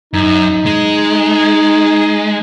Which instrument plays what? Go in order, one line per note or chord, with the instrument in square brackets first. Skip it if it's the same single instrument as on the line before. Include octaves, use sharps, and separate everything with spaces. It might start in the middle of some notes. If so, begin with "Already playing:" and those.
[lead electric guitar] F#2 [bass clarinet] D#4
[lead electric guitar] G#3